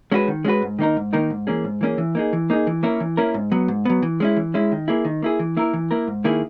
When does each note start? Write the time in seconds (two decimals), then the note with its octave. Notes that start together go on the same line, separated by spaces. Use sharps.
0.12 G#3 C#4 F#4 B4
0.28 D#3
0.45 G#3 C#4 F#4 B4
0.62 G#2
0.79 D#3 A#3 D#4 A#4
0.97 G#2
1.13 D#3 A#3 D#4 A#4
1.30 G#2
1.47 E3 A#3 C#4 G#4
1.64 G#2
1.81 E3 A#3 C#4 G#4
1.98 E3
2.15 A#3 D#4 G#4
2.33 E3
2.50 A#3 D#4 G#4
2.67 E3
2.83 A#3 C#4 E4 A#4
3.00 E3
3.17 A#3 C#4 E4 A#4
3.34 G#2
3.52 F#3 B3
3.68 G#2
3.85 F#3 B3
4.02 E3
4.20 G#3 C#4 E4
4.36 E3
4.54 G#3 C#4 E4
4.72 D#3
4.88 A#3 E4 G#4
5.05 D#3
5.22 A#3 E4 G#4
5.39 E3
5.57 A#3 E4 A#4
5.73 E3
5.91 A#3 E4 A#4
6.08 G#2
6.24 D#3 A#3 E4 G#4